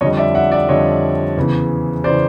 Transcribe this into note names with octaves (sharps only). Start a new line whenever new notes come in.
F2 D3 G3 C#5 D#5
D5 E5
E5 F#5
D5 E5
F2 D3 G3 C#5 D#5
E2 C#3 E3
C#3 E3 C5 D5